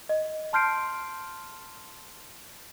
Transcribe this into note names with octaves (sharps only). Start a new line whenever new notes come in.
D#5
A5 C6 F6 G6 C7 D7